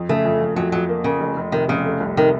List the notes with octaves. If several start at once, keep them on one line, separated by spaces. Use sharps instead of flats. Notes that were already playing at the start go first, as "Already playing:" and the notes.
Already playing: F2
C#3 A3
F2
F2
F2 F#3
F2 F#3
A#3
C#3 A#3
F1
F1
C3 D#3
F1 C#3
A3
C2
C3 D#3